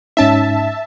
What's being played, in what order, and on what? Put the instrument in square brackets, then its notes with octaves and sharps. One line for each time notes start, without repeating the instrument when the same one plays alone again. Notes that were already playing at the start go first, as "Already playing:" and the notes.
[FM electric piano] G#2 C#4 D#4 [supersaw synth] E5 A5